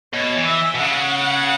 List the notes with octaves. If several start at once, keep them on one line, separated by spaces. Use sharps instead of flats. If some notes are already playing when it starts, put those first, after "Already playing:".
B2 C#5
E3
E5
B2
C#3 F#5